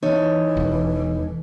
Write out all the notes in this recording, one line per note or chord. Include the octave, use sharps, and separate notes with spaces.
E3 D#4 A4 C#5
E1